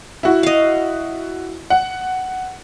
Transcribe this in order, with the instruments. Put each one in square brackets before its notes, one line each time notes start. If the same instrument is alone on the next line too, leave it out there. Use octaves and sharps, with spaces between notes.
[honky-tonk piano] E4 F#4
[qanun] D#5 F5
[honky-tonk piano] F#5